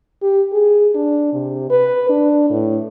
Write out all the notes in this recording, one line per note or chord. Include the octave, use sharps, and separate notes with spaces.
G4
G#4
D4
C3
B4
D4
A2